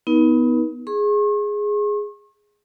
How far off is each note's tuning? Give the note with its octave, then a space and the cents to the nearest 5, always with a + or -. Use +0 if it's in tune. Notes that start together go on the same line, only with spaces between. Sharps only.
B3 +0 D#4 +30 A#4 +45
G#4 +0 C#6 -45